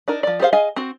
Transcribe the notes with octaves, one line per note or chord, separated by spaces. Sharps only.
D4 D#4 A#4
F3 D5
G4 G#4 C5 F5
G#4 D#5 F5 G#5
C4 F#4